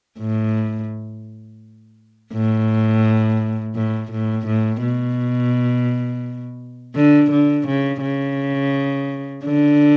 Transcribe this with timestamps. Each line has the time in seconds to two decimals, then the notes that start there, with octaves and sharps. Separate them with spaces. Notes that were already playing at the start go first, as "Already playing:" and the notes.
0.19 A2
2.33 A2
3.75 A2
4.11 A2
4.46 A2
4.82 B2
6.95 D3
7.31 D3
7.67 C#3
8.02 C#3
9.44 D3